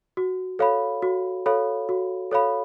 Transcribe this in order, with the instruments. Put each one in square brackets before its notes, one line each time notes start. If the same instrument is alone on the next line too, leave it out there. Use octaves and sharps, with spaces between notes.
[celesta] F#4
A4 C#5 F5 B5
F#4
A4 C#5 F5 B5
F#4
A4 C#5 F5 B5